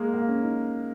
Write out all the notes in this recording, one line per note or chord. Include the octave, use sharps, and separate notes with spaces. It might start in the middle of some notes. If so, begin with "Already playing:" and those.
Already playing: G#3 A#3
A#3
C#4
D#4